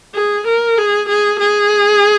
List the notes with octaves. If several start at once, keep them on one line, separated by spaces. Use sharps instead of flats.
G#4
A#4
G#4
G#4
G#4